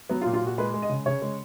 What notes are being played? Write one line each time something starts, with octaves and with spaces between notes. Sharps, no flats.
F#3 B3
F4
A#2
F4
A#2
F#4
G#3 B4
G#3
D#5
C#3
C#3 C#5
G#3